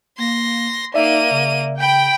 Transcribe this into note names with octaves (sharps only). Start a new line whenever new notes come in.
A#3 C6 A#6
A#3 D#4 D5 E5 D#7
C#3
G5 B5